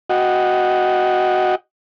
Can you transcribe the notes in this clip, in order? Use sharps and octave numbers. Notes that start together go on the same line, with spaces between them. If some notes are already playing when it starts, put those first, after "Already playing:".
F#4 D#5 F#5 G5